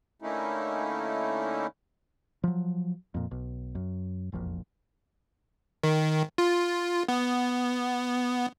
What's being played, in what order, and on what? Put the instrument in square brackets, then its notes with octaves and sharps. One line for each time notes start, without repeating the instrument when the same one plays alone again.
[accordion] D3 A3 A#3 C#4 D#4 E4
[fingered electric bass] F3 F#3
F2 A#2
B1
F#2
E1 A#1 F2 A#2
[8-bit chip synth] D#3
F4
B3